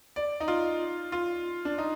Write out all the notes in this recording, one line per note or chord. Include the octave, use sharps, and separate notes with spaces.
D5
D#4
F4
F4
D4
D#4